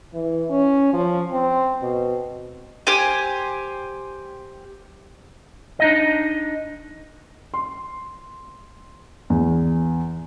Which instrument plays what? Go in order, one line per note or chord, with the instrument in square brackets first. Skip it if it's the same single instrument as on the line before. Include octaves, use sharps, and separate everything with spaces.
[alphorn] E3
C#4
F3
C4
B2
[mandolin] G4 C5 G#5
[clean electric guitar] D4 D#4 D#5
[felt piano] C6
E2